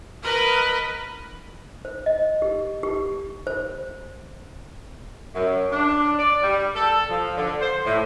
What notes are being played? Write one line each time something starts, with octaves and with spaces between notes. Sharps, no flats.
A#4 B4 D#5 B5
C5
D#5
G4
G4
C5
F#2
D4
D5
G3
A4
F3
D3
C5
A2